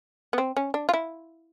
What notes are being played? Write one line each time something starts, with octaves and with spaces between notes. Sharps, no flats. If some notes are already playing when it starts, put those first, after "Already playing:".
B3
C4
C#4
D4
F4
E4